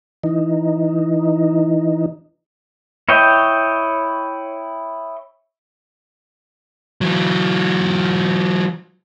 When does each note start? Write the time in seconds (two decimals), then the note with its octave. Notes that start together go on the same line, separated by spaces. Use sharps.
0.24 E3 D#4
3.09 E4 C#5 D#5 G5
7.01 E3 F#3